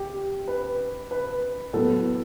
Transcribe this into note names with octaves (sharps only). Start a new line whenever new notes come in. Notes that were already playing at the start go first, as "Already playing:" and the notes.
Already playing: G4
B4
B4
A2 F#3 B3 A4